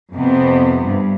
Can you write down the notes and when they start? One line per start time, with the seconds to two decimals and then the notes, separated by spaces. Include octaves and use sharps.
0.12 F2 C3 B3
0.83 G2